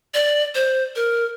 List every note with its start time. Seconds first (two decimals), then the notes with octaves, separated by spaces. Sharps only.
0.14 D5
0.55 C5
0.96 A#4